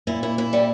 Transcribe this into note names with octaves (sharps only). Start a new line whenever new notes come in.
A#2 E4
E4
E4
G3